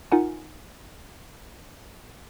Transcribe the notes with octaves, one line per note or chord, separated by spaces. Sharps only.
D#4 F4 A#4 F#5 G#5